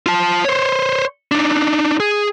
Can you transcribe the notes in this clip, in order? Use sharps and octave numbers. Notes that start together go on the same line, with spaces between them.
F4 A5
C5 C#5
D4 D#4
G#4